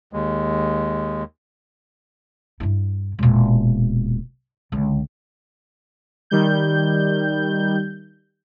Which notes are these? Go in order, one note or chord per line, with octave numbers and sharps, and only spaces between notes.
D#2 G#3
G2 E4
E1 A#2
C#2 D3
D#3 G3 G6